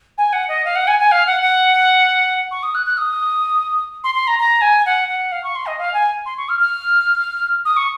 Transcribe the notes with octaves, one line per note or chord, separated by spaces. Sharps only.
G#5
F#5
D#5
F5
F#5
G#5
G#5
F5
F#5
F#5
C#6
D#6
F#6
F#6
D#6
C6
C6
A#5
A#5
G#5
F#5
F#5
F5
C#6
C6
D#5
F5
G#5
C6
C#6
F6
F6
D#6
C#6